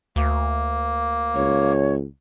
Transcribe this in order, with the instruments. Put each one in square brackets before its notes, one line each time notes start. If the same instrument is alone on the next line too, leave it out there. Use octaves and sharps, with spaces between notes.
[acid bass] D2 [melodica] A#3
[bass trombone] C#2 [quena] C#5